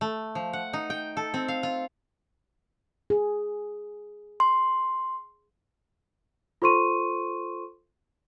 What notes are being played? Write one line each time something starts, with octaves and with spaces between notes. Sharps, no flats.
A3
F3
F#5
D#4
G5
A4
C4
F5
F4
G#4
C6
F4 A4 C5 C6 C#6 D#7